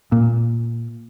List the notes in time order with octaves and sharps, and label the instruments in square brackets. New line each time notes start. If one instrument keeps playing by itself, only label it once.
[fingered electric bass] A#2